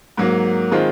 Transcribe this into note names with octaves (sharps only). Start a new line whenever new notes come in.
G#2 F#3 A#3
D#3 G#3 C4 F4